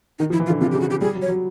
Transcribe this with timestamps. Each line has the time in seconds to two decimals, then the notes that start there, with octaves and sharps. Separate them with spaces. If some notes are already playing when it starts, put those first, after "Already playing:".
0.19 D#3 D#4
0.30 F3 E4
0.39 E3
0.46 F4
0.50 D3
0.61 C3 F4
0.71 C#3 G4
0.80 F#4
0.90 G4
1.01 G3 G#4
1.15 F#3
1.22 C#5
1.28 F#3